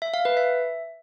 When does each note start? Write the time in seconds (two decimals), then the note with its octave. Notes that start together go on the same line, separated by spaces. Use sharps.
0.02 E5
0.14 F5
0.25 B4
0.37 E5